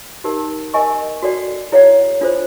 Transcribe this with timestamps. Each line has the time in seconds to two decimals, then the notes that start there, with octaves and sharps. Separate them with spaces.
0.24 D#4 G4 A#4
0.74 A#4 D#5 G#5 C#6
1.22 F#4 A4 D5 G5
1.72 E4 G#4 C#5 F#5
2.21 D4 F4 A4 C5